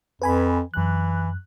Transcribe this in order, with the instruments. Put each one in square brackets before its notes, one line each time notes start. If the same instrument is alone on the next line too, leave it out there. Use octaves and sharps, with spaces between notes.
[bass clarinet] F2 [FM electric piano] B4 G#5 B5
[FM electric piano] F#2 F#6 [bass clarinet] E3